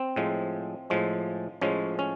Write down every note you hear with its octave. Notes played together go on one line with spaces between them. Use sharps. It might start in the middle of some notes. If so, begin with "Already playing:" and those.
Already playing: C4
A2 F3 G#3
A2 F3 G#3
A2 F3 G#3 C#4
C#4